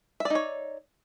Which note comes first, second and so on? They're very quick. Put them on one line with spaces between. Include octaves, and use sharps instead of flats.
E5 D5 D#4 C#5